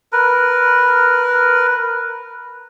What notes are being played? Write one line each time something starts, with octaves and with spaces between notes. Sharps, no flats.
A#4 B4